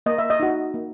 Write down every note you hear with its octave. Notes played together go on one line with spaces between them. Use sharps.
A#3 D#5
E5
D#5
D#4 F#4
A#3